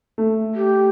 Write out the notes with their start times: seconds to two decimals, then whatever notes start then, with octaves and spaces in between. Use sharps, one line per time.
0.18 A3
0.55 G4